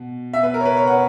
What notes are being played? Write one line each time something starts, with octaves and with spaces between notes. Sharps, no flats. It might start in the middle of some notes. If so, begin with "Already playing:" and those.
Already playing: B2
B2 E5
B4
A#4
C#5
B4
C#5
F#5